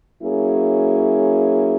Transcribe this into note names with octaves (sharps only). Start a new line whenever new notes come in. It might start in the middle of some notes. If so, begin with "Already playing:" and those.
F#3 A#3 C#4 E4 G#4